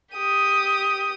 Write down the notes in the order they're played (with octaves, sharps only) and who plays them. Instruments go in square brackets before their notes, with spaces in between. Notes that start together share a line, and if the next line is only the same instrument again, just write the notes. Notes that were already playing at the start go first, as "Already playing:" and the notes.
[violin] G4 D#6